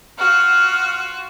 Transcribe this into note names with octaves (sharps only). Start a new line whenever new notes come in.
F4 F#4 F6